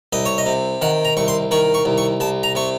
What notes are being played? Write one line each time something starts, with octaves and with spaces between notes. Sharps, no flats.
C2 D#5
C#5
D#5
C3
D#3 F#5
A#5
C2 C#6
C6
D#3 C#6
C#6
C2
C#6
C2 A5
A#5
C3 C#6